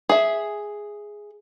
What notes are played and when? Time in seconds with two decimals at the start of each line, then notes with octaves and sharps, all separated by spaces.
0.09 G#4 E5